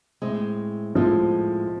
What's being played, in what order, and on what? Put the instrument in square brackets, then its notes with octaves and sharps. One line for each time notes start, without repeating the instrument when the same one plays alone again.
[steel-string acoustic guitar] A2 G#3 C4
[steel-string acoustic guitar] A2 G#3 C4 [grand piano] F3